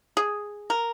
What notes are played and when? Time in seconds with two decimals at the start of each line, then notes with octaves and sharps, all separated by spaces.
0.17 G#4
0.70 A#4